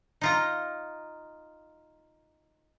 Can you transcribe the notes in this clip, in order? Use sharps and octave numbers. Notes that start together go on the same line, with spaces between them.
D#4 F4 A#5